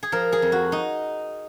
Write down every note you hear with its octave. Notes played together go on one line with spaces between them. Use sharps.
G#4
F3 A#4
G#4
F2
F#4
D#4